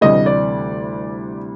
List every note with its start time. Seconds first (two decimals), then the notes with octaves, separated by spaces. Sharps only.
0.01 D2 C3 E3 G3 D#5
0.26 D5